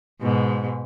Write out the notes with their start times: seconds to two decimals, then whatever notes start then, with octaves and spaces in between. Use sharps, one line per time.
0.22 G#2 B2